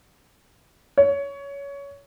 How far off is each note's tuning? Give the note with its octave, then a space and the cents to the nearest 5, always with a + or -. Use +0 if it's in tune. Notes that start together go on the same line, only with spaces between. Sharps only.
C#5 +20